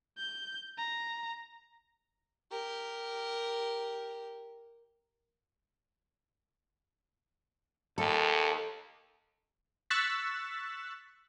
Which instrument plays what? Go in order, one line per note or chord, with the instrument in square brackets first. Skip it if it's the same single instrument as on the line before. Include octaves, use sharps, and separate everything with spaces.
[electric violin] G6
A#5
[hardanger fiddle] G4 A#4
[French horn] D#2 [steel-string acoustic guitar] A4
[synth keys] C#6 E6 F#6 A6 B6